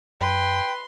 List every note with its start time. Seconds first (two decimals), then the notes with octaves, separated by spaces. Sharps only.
0.21 F#2 B4 G5 C6